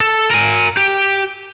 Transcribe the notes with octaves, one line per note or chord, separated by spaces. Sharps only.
A4
A#4 G#5
G4